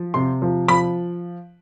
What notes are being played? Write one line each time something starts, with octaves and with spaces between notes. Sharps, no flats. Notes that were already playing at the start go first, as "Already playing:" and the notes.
Already playing: F3
C3 C6
F3
F3 B5